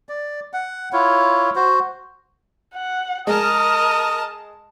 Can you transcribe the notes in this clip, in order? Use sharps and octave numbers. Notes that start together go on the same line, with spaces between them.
D5
F#5
E4 F4 C#5
F#4 C5
F#5
G#3 A#4 D#5 A5 D#6